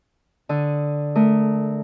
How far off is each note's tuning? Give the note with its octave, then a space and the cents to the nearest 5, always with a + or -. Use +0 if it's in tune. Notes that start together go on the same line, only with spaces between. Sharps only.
D3 +0 D#6 +0
A3 -20 A#4 -15 D#6 +0